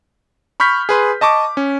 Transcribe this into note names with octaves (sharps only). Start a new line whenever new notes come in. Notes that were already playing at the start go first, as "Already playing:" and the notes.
B5 C#6 F6 G6 B6
G#4 B4 C6
D#5 A5 C#6 D6
C#4